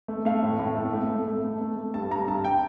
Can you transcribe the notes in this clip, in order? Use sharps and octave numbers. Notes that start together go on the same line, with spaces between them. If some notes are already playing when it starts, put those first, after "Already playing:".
A3
A3 F5
A2
A2
A3
A3
A3
A3
A3
A3
A3
G2 A5
G2 A#5
G2 A5
G5